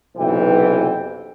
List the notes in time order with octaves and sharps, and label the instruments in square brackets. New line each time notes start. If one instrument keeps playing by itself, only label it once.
[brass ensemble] F#1 B1 C3 E3 G5